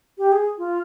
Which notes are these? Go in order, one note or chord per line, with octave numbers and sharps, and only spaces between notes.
G4
G#4
F4